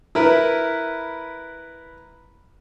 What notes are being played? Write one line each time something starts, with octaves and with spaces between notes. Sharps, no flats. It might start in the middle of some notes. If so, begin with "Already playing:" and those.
E4 A#4 B4